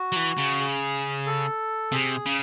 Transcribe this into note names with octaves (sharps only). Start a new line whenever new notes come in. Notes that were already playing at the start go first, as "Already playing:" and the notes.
Already playing: F#4
F#3
E3
C#3
G#4
A4
C3 G#4
C#3